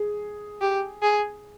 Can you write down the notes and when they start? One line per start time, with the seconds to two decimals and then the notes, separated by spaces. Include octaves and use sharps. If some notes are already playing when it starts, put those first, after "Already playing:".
Already playing: G#4
0.61 G4
1.02 G#4